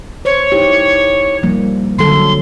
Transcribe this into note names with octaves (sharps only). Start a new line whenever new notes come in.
C5 C#5
D#4 E4 G4
F3 G3 A#3
D3 F#3 A4 C6